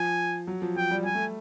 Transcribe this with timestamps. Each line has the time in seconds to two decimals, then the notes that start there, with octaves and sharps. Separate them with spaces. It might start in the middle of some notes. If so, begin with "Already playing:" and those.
Already playing: F3 G#5
0.47 F#3
0.62 F3
0.76 F3 G5
0.91 G3
1.05 G3 G#5
1.15 A3